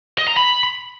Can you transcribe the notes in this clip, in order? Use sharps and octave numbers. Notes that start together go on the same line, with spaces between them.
D#5
A#5
B5